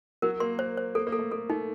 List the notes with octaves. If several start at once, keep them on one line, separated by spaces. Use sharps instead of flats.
F#3 A#4
A#3 C6
C5
C5
A#3 A4
A#3
A4
A3
A#3 A4
A3 D#4